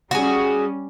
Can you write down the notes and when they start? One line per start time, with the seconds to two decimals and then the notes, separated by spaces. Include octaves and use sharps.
0.11 G3 C#4 F#4 G#4